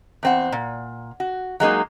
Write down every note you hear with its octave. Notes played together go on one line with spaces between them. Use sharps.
E2 C4 F#5
A#2
F#4
F#3 G#3 A#3 D#4